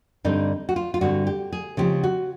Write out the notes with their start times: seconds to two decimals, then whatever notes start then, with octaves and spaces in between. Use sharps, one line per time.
0.24 G2 D3 G3 C4 D#4
0.69 F#4
0.76 F4
0.94 F4
1.01 G2 D3 G3 C4 F#4
1.27 G4
1.52 G#4
1.77 C#3 F3 G#3 C4 G4
2.04 F#4